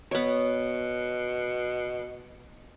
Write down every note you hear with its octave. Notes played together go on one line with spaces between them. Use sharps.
B2 B3 C#5